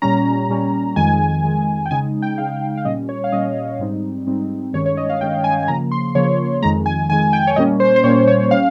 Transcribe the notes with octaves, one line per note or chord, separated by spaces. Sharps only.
A#2 G3 C#4 A#5
A#2 G3 C#4
F2 D#3 G#3 G#5
F2 D#3 G#3
G5
C#3 G#3 D#4 G#5
G5
C#3 G#3 D#4 F5
F5
A#2 G3 C#4 D#5
C#5
F5
A#2 G3 C#4 D#5
G#2 G3 C4 D#4
G#2 G3 C4 D#4
G2 D#3 G#3 C#4 C#5
C#5
D#5
F5
G2 D#3 G#3 C#4 G5
G#5
G#5
C#3 F3 A#3 A#5
C6
C#3 F3 A#3 C#5
F2 D#3 G#3 A#5
G#5
F2 D#3 G#3 G#5
G5
C#5
A#2 G3 A#3 C#4 D#5
C5
C5
A#2 G3 A#3 C#4 C#5
C#5
G3 C#4 F5